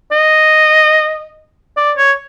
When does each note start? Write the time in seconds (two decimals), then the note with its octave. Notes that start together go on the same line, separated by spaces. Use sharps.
0.12 D#5
1.77 D5
1.98 C#5